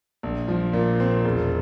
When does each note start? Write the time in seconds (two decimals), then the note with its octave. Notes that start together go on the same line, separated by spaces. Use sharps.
0.23 A#1
0.48 F3
0.73 A#2
1.00 C4
1.25 E1